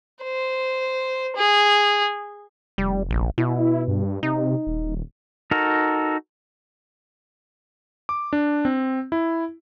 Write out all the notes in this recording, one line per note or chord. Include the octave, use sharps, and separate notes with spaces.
C5
G#4
F1 G3
A#1
B2 E4
G2
C3 D#4
D#1
D#4 F#4 A4 A#4
D6
D4
C4
E4